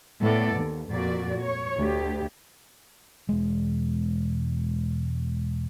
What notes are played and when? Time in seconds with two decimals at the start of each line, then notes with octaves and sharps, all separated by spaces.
0.21 A2 B3 A4 D5
0.55 D#2
0.90 F2 A#2 F#4 D5
1.42 C#5
1.77 D2 G4
3.29 E1 G#3